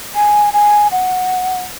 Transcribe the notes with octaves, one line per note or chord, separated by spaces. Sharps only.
G#5
G#5
F#5